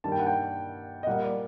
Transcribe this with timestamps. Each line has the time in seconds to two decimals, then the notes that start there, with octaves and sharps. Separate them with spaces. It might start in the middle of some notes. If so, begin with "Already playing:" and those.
0.04 G2 D#3 G3 A#3 A5
0.12 G5
0.19 F#5
0.27 G5
1.03 D#5
1.07 A#2 G3 A#3 F#5
1.24 D5